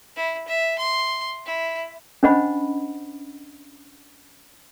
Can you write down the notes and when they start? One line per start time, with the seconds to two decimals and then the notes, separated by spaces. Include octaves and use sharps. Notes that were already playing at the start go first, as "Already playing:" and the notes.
0.16 E4
0.48 E5
0.78 C6
1.46 E4
2.23 C#4 D4 C5 D#5 F#5 B5